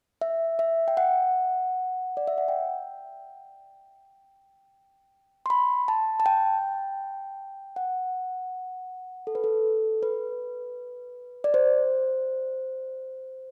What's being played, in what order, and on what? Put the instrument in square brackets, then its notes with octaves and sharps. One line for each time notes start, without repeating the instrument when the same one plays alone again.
[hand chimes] E5
E5
G5
F#5
D5
E5
F#5
G5
C6
B5
A5
A5
G5
F#5
A4
B4
A4
B4
D5
C5